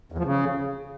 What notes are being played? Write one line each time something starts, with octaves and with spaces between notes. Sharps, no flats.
E2
F3
C#3